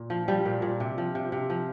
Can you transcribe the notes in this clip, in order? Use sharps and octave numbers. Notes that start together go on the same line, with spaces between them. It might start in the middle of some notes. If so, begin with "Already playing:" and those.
Already playing: A#2
F3
F3 G3
A#2
A#2
C3
F3
C3
C3
F3